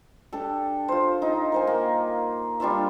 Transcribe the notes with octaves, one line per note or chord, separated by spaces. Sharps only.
D4 G4 A4
F4 C5
D#4
A#4 C5 G#5
A#3
G3 D4 F4 E5